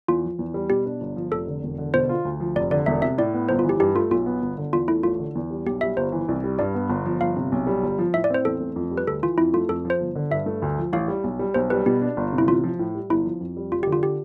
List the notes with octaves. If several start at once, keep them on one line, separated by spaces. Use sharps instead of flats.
E2 F4
F3
E2
G3
B2 G4
D4
G1
F3
F1 A4
D3
E1
D3
B2 C5
F4
D2
F3
F1 D5
D3 D5
E1 E5
C3 E5
A2 D5
B3
G1 C5
F4
E3
G4
G2 G4
A3 F4
B1 F4
B3
G1
D3
E2 F4
A3 E4
A1 F4
D3
E2
G3
B1 G4
G3 E5
G1 C5
E3
C2
G3
G2 D5
B3
G1
F3
G1 F5
C3
B1
G3
G1
F3
A2 E5
D5
C4 C5
E2 A4
A3
F2
G3
B4
D2 A4
E3 F4
F2 E4
A3 F4
F2 A4
F3
C5
G1
D3
G2 E5
A3
D2
F3
A1 F5
G3
B1
G3
B1 C5
G3 B4
B2 G4
D4
G1
C3
E4
A1 F4
F3
A2
G3
G1 E4
F3
F2
G3
F1 F4
G4
D3
F4
G4